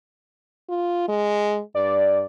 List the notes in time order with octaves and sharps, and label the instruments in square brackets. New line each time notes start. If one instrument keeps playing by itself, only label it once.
[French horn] F4
G#3
[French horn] G2 [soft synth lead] D5